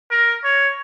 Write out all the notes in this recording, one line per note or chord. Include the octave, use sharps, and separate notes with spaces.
A#4
C#5